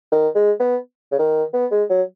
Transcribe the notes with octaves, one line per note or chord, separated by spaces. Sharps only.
D#3
G#3
B3
C#3
D#3
B3
G#3
F#3